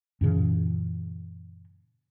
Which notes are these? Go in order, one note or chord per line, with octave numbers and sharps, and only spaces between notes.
F#2 A#2 C#3 E3